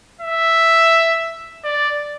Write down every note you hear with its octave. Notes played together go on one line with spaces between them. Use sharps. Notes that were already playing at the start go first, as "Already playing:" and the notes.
E5
D5